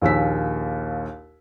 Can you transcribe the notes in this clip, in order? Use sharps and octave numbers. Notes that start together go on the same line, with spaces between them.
A#1 D#2 E6 B6